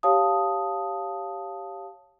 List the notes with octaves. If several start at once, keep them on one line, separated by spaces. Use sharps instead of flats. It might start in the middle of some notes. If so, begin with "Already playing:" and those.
G4 C#5 F5 A5 D#6